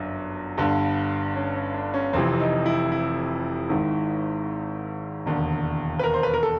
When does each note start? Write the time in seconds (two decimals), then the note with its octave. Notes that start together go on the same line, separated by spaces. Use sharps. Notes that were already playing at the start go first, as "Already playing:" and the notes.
Already playing: G1 F#2 D4
0.58 G1 G2 D3
1.36 C#4
1.56 C#4
1.74 D4
1.94 C#4
2.13 F1 F2 C3 E3 C4
2.40 D#4
2.66 E4
2.92 E4
3.69 G#1 G#2 D#3
5.26 E1 D#2 D3
5.99 B4
6.04 A#4
6.14 C5
6.23 B4
6.33 A#4
6.43 A4